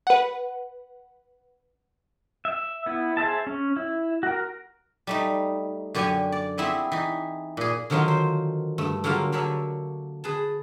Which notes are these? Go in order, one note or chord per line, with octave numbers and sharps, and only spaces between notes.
B4 F#5
E5
B3 E4
G#4 C5 E5 A5
C#4
E4
F#4 A#4
G3 A3 D#4
F#2 D3 G4 C#5 G5 G#5
D5
B3 C4 E4 G4 G#4
E3 D#4
A#2 G#4
D3 D#3 F3 F#3 F4 A#4
C5
G2 A3
D3 F#3 G3 A#3 F4 A#4
D3 D4 A#4 C#5 E5 G#5
G#4 B4 A5